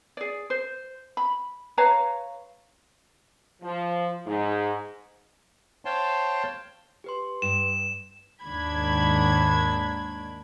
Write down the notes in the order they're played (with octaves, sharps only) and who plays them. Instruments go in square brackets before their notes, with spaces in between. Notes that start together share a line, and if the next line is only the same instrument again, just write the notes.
[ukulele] G#4 D5
C5
B5
B4 C#5 F5 A#5
[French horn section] F3
G#2
[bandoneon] C5 C#5 F5 G5 A5 C6
[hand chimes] G4 B4 C6
[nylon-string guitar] G2 [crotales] E7
[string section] D#2 G#2 D#3 D4 B5 G#6